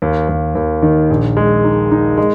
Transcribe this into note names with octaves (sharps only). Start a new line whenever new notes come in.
D#2
D#2
D#2
D#3
A#1
G#3
D#4
D#4
G#3